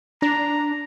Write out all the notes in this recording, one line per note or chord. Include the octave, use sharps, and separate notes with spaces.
D4 A#5